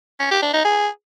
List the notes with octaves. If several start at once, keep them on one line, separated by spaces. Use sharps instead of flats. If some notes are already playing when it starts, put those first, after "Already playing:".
C#4
G4
D4
D#4
G#4